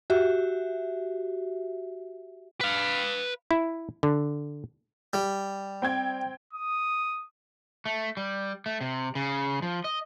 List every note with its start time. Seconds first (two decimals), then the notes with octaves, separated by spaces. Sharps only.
0.10 F#4 G4 E5
2.61 B4 F5
3.51 E4
4.03 D3
5.13 G3
5.82 C4 G5 G#6
6.53 D#6
7.85 A3
8.17 G3
8.66 A3
8.81 C3
9.15 C#3
9.62 F3
9.84 D#5